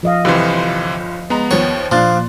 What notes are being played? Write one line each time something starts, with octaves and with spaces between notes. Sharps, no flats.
F3 D#5 F5
G1 C3 E3 F4 C5
G#3 B3 A#5
D#2 F3 C#5
A#2 F3 D4 C6 F#6 A6